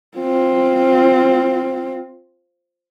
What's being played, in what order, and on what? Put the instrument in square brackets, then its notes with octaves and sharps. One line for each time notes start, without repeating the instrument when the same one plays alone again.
[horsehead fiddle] C4 F4